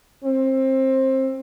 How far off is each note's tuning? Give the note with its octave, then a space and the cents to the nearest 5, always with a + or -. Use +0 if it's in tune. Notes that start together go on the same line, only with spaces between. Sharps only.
C4 +20